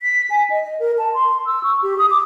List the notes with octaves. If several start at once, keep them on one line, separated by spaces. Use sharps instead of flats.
B6
G#5
D#5
D#5
A#4
A5
C6
E6
C#6
G4
D#6
D6